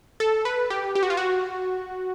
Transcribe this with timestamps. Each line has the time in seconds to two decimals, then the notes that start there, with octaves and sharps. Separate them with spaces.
0.20 A4
0.45 B4
0.70 G4
0.95 G4
1.03 F#4
1.10 F4
1.17 F#4